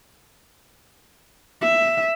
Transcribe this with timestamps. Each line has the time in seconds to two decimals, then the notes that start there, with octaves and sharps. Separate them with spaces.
1.62 E5